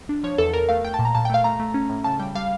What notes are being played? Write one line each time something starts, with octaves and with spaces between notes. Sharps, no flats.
D4
F3 C#5
E2 A4
E2 A#4
A3 F5
A3 G5
A5
A#2
A#5
A#2 A5
G5
A3 F5
A3 A#5
A3
C#4
A2
C#3 A5
G3 G5
G3 F5